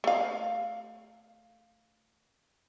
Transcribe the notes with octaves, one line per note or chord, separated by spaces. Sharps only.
A3 F5